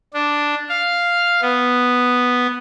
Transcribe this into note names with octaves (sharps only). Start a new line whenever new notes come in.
D4
F5
B3